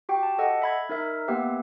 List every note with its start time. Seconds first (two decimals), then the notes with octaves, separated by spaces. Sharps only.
0.09 F#4 G4 G5
0.23 A5
0.39 A4 D#5 F#5
0.62 E5 B5 G#6
0.89 D#4 A#4 E5
1.28 A#3 B3 G4 B4 E5